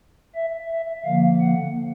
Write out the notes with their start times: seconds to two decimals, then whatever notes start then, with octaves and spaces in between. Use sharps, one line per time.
0.36 E5
0.71 E5
1.05 D3 F3 A#3 F5
1.41 F#5